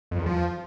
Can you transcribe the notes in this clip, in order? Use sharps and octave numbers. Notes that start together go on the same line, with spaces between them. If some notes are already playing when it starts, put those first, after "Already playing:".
F2
E2
F3